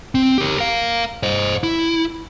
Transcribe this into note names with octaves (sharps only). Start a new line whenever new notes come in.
C4
G4 A#4
A#4 F5
C5 D#5
E4